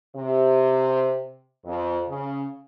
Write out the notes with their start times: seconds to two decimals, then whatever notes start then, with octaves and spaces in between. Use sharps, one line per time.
0.15 C3
1.65 F2
2.08 C#3